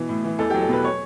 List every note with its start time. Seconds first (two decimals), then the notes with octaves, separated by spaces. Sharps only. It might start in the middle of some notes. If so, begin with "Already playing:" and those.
Already playing: B2 E3
0.09 A2
0.24 E3
0.39 E2 A4
0.50 F#3 G4
0.61 A4
0.69 B2 B4
0.84 C#5